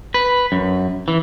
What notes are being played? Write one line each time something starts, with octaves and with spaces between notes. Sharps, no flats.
B4
F#2
E3